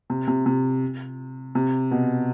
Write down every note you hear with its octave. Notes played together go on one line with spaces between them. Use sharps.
C3
C3
C3
C3
B2